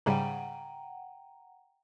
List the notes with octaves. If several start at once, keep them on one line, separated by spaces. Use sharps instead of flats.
G#2 C#3 G3 F#5 G5 A#5